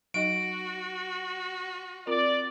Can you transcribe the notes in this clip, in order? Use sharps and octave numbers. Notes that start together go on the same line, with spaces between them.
F#3 D#4 F#4 D#5 D7
C4 F4 A#4 D5